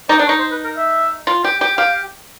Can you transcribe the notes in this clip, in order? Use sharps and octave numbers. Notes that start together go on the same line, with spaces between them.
D#4 D5
D4
D#4 C#5
C5
B4
A#4
E5
F4
G4
G4
G4 F5